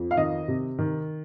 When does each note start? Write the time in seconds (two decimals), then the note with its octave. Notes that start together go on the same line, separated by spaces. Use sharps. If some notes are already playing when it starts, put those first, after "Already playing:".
Already playing: F2
0.11 F5
0.17 D#3 D#5
0.48 C3
0.79 D#3